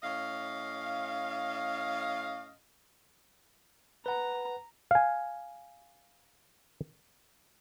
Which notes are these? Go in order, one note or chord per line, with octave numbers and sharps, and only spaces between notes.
A2 C#4 D#5 F5
B4 F#5 A#5
F5 G#5